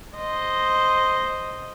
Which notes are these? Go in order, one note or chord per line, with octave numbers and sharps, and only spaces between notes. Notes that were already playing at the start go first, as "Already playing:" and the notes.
C5 D#5